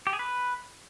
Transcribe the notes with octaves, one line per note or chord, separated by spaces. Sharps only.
G4
G#4
B4